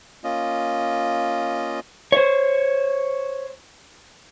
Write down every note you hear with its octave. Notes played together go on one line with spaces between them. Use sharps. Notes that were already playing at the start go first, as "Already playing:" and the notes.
A#3 C#4 F4 D#5
C5 C#5